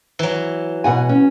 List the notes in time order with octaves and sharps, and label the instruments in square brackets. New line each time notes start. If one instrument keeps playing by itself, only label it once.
[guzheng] E3 F#3
[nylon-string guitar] B2 F#5 G#5
C#4